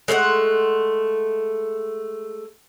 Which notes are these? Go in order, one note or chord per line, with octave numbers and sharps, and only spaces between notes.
G#3 A3 E5 F#5